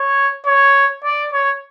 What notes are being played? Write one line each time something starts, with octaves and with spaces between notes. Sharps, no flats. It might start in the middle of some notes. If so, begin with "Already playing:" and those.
Already playing: C#5
C#5
D5
C#5